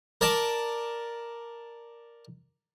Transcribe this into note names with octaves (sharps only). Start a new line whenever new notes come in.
A#4 D5 A5